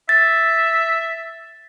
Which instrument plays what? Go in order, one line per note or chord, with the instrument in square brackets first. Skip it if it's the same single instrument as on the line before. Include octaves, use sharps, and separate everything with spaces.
[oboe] E5 [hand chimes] A6